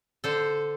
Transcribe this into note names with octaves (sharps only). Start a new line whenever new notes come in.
D3 A4 C5